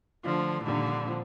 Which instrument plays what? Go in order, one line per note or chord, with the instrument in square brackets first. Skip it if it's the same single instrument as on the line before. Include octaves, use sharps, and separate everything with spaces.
[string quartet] D3 F3 [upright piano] A3 D4 F4
[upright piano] F2 D#3 G3 D4 [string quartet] A#2 D3
[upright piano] F3 C4